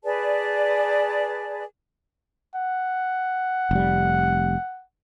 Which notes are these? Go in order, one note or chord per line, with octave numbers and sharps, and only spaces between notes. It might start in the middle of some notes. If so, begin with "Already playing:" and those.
G#4 B4 D5 A5
F#5
F1 G3